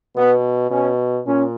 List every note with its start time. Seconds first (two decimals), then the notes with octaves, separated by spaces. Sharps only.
0.16 B2 B3
0.71 B2 C#4
1.26 A#2 C#4